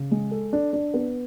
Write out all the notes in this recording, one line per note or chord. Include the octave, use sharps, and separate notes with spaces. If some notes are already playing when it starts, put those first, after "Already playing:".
Already playing: C#3
G#3
A4
D4
D4
B3